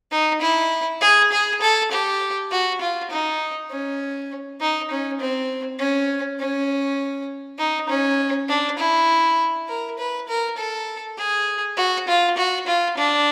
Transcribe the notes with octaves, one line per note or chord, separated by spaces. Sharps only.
D#4
E4
G#4
G#4
A4
G4
F#4
F4
D#4
C#4
D#4
C#4
C4
C#4
C#4
D#4
C#4
D4
E4
A#4
B4
A#4
A4
G#4
F#4
F4
F#4
F4
D4